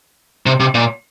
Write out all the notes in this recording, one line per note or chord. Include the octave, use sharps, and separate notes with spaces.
C3
C3
A#2